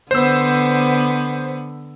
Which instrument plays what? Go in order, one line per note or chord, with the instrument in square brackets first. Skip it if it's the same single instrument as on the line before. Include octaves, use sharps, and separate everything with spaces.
[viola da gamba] D3 B3 [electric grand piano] C5 E6